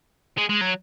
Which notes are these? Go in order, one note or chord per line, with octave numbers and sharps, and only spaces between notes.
G#3
G#3
F#3